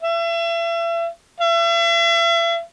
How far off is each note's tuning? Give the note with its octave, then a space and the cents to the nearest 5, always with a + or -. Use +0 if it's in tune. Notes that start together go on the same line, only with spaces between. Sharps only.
E5 +35
E5 +40